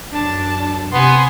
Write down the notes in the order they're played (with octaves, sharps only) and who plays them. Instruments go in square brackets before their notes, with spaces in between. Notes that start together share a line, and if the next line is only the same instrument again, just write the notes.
[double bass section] F#2 [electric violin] D4 A5
[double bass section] C3 [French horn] B3 [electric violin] G#5 C6